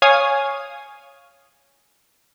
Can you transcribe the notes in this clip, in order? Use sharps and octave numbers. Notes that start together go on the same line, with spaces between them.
C#5 F5 G#5 D#6